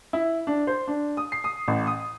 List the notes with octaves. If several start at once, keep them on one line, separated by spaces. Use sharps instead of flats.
E4
D4
C5
D4
D#6
C7
D#6
A1
D#6